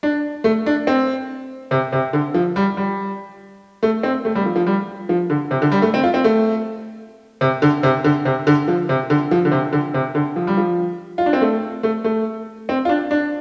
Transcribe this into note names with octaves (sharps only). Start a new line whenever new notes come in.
D4
A3
D4
C4
C3
C3
D3
F3
G3
G3
A3
C4
A3
G3
F3
F3
G3
F3
D3
C3
D3
G3
A3
C4
F4
C4
A3
C3
D3
C3
D3
C3
D3
F3
C3
D3
F3
D3
C3
D3
C3
D3
F3
G3
F3
F4
D4
C4
A3
A3
A3
C4
F4
D4
D4